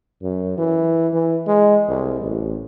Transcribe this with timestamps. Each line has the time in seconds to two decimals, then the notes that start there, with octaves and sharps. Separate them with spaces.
0.23 F#2
0.58 E3
1.14 E3
1.47 G#3
1.89 C2
2.21 A1